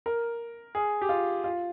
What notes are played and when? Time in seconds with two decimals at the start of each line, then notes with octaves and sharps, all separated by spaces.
0.06 A#4
0.75 G#4
1.02 G4
1.09 F4
1.44 F4